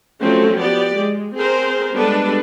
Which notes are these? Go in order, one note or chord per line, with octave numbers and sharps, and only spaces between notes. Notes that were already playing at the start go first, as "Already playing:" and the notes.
F3 F#3 A3 C4 C#4
B3 G4 D5
G#3
C4 G#4 A#4 C5
G3 G#3 B3 D4 A4 B4